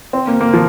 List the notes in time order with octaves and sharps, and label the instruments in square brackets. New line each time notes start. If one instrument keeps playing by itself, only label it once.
[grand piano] C4
A#3
A#3
F3